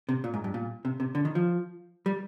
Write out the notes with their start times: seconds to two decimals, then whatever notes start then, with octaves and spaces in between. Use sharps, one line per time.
0.09 C3
0.24 A#2
0.34 G#2
0.44 G2
0.54 A#2
0.85 C3
1.00 C3
1.15 D3
1.25 D#3
1.35 F3
2.06 G3